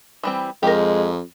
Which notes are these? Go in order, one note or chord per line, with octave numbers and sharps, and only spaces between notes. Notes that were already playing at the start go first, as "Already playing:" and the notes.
E3 G3 C4
F2 G#3 G4 A#4